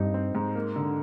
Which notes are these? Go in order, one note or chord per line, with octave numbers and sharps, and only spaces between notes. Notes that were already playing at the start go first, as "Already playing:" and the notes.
Already playing: G2 G3 C4 D#4
C4
G#2
A#3
D3